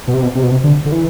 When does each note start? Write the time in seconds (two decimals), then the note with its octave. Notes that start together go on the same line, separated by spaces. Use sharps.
0.08 B2
0.14 C3
0.23 B2
0.35 C3
0.43 B2
0.51 C3
0.64 D3
0.86 D3
0.92 E3